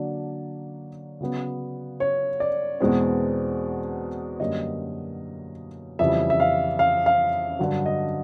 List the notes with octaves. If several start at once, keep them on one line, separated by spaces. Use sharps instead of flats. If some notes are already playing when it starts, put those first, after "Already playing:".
Already playing: D3 F#3 A#3 D4 D5
C#3 F#3 B3
C#5
D5
E2 B2 G#3 C4
F#2 D3 G3 A#3 C#4 D#5
F2 C#3 E3 G3 E5
E5
F5
F5
F5
G2 D3 F#3
D#5